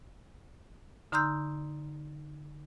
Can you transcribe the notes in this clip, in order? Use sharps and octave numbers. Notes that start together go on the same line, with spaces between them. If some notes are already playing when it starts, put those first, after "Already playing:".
D3 D#4 A#5 C6 E6 G6